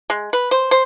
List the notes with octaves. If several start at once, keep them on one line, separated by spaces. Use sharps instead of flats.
G#3
B4
C5
C5